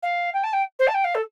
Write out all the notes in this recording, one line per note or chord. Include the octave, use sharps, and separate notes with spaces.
F5
G5
A5
G5
C5
A5
G5
F5
A4